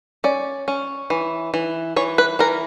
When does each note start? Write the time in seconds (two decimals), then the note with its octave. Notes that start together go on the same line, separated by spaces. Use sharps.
0.24 C#4 D5
0.68 C#4
1.10 E3
1.54 E3
1.96 E3 C#5
2.18 B4
2.39 E3 A#4